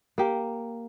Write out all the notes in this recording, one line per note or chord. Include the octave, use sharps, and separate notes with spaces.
A#3 G4